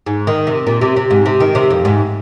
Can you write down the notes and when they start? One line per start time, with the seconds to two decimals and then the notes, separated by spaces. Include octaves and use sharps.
0.06 G#2
0.27 D#3
0.47 C3
0.67 A#2
0.81 C3
0.96 C3
1.10 G#2
1.26 C3
1.40 D#3
1.55 C3
1.70 F2
1.85 G#2